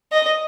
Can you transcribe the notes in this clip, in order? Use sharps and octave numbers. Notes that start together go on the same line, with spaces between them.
D#5